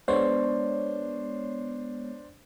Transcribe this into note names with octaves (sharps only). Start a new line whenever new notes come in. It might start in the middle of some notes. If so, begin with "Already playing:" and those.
G#3 B3 D4 C5 C#5